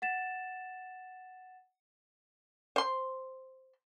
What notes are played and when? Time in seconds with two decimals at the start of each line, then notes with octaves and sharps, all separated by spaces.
0.02 F#5 A6 E7
2.76 C5 C6